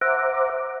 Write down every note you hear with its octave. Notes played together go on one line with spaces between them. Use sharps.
C5 E5 F#5 A#5 D6